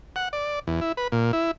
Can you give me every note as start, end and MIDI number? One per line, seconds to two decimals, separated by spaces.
0.16 0.29 78
0.33 0.59 74
0.67 0.81 40
0.81 0.92 64
0.97 1.08 71
1.12 1.32 46
1.33 1.51 64